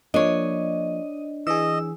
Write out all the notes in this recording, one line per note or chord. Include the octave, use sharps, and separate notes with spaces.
F3 A#3 D4 C#5 D#5
E3 G#4 D#5 E6